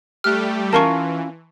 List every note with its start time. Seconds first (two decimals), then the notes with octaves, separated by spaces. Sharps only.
0.24 G3 A3 G4 F6 F#6
0.73 E3 C#4 F4 A#4 A5 C6 C#6